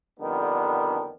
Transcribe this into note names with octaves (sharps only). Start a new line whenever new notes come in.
F2 D3 D#3 G3 B3 D4